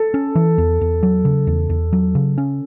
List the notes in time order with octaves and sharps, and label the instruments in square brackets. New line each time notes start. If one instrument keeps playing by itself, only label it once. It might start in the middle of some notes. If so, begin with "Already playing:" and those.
Already playing: [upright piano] A4
[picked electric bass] C#4
E3
E2
E2
F#3
C#3
E2
E2
F#3
C#3
C#4